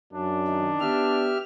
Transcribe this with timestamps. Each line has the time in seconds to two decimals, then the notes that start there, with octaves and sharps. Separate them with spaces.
0.13 F#2 D4
0.48 D#3 D#4
0.81 B3 G4 E5 F6